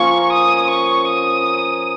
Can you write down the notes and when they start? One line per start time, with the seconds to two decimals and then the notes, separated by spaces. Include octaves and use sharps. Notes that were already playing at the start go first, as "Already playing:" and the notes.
Already playing: F3 A#3 C#4 C#6
0.32 D#6
0.70 C#6
1.07 D#6